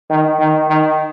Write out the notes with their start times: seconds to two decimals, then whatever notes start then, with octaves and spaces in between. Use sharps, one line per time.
0.10 D#3
0.39 D#3
0.68 D#3